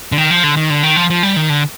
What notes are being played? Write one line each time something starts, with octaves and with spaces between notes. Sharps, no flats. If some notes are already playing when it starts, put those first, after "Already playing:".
D3
D#3
F3
D3
D#3
D3
D#3
F3
F3
G3
D#3
D3